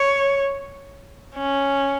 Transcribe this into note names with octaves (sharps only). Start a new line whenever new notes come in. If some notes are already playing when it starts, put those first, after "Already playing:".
Already playing: C#5
C#4